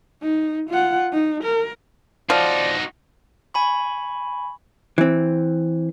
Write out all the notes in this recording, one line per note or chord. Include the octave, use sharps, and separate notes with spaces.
D#4
F4 F#5
D#4
A#4
F3 D#4 F#4 D5
G#5 B5 C#6
E3 C4